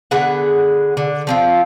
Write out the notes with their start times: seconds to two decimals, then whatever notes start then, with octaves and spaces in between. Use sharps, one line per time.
0.11 D3 B3 G#4 F#5
0.97 D3
1.27 F3 C4 F4